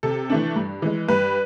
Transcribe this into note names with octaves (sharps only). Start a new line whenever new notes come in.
C3 A4
E3 A3 D4
G2
E3 G#3
G2 B4